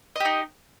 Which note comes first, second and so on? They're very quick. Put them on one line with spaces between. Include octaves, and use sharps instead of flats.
D#5 G4 D#4